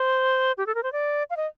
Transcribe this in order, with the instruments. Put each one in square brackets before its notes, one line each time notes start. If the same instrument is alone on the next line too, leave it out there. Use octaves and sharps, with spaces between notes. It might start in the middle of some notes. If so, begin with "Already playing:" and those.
Already playing: [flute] C5
G4
A4
A#4
C5
D5
F5
D#5